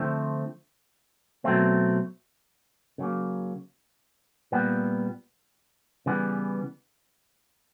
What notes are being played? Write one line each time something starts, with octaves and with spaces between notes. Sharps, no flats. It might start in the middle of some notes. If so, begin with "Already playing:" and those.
Already playing: D3 F3 A3 C4
B2 F#3 A3 C4
C#3 F#3 A#3
A#2 G3 B3
C#3 E3 G3 B3